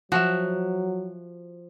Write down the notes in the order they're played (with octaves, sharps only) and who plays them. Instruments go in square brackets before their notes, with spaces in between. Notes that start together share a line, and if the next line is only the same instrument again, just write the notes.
[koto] F3 [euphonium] F#3 [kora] F#4 E5